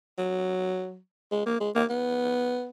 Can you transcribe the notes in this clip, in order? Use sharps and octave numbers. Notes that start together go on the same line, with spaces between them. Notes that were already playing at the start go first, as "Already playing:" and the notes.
F#3
G#3
A#3
G#3
A#3
B3